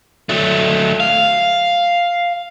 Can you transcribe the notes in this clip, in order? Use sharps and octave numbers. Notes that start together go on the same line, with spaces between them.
F#3 A3
F5